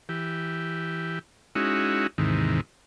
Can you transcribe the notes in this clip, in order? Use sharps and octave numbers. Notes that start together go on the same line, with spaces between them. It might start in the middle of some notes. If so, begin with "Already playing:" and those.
E3 G4
G#3 C#4 D#4 E4 F#4
D#2 G#2 C3 D#3 E3